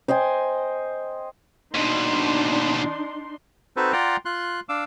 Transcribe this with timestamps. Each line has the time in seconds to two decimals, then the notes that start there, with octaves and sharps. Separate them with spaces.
0.08 C5 D#5 G5 G#5
1.75 D#2 B2 D4 D#4 C6
3.77 C4 D#4 F#4 A4 B4 C5
3.93 F4 D5 F#5 G5 A#5 C6
4.25 F4 C6 F#6
4.69 D4 F5 D6 E6